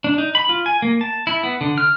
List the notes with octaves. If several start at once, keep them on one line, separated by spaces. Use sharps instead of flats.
D4
D#4
B5
F4
G#5
A#3
A5
E4
B3
D3
F6